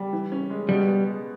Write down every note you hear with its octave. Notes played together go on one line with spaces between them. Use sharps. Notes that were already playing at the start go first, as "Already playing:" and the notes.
Already playing: G3
E3
C#4
G#3
B2 G3
B3
G#3